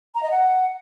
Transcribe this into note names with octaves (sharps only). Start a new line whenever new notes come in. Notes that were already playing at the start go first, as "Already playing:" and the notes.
A#5
D#5
F#5